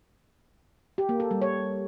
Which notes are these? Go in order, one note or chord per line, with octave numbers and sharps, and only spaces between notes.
G4
A#3
A4
G3
C#5